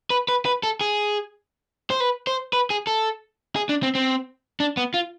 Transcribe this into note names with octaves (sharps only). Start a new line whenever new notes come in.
B4
B4
B4
A4
G#4
C5
B4
C5
B4
G#4
A4
G#4
D4
C4
C4
D4
B3
F4